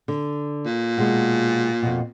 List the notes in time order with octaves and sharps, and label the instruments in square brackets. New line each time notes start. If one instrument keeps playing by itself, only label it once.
[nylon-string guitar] D3
[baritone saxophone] A#2
[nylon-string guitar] B2 G#3 B3
F2 B2